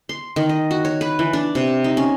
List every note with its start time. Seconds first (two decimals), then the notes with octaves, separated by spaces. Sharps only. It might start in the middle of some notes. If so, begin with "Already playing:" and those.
0.09 C6
0.36 D#3
0.49 D#5
0.71 F#4
0.85 C#5
1.01 B4
1.19 E3
1.33 D4
1.55 C3
1.84 D#4
1.97 C#4